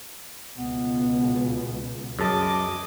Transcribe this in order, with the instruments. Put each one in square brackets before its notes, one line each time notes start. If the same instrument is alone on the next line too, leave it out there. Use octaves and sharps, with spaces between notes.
[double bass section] C#2 B2 [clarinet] B3
[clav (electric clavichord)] F#2 A5 [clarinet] G#4 [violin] D#5 D6